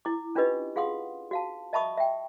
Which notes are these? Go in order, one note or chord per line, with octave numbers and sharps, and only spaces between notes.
E4 D6
C#4 D4 F4 G4 B4 D#5
F4 G#4 F5 F#5 C6 D#6
F#4 F5 A5
D#5 E5 A5 B5 C#6 D#6
E5 G5